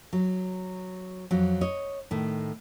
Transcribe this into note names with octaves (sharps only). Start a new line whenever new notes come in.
F#3
F2 F#3
C#5 D#5
A2 D#3